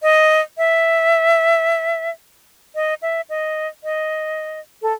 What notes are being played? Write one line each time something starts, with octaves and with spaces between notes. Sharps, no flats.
D#5
E5
D#5
E5
D#5
D#5
A4